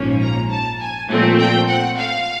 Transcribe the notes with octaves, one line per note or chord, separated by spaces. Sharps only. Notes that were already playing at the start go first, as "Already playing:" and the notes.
Already playing: A#1 G#2 F3 A#3 C#4
A#5
A5
G#5
A#2 F3 A3 C4
G5
F#5
F5